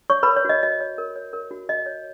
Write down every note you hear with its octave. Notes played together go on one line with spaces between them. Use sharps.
C#5 C#6
A#4 B4 B5
C#5
F#4 D#5
F#4 D#5
C#5
A#4
C#5
A#4
F#4
F#4 D#5
C#5